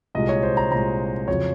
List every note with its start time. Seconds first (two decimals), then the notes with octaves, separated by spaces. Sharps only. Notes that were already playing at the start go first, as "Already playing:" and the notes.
0.15 C2 A#2 G#3 D#5
0.29 C#5
0.43 C5
0.57 A#5
0.71 C2 A#2 G#3 A#5
1.28 F2 C#3 F#3 C#5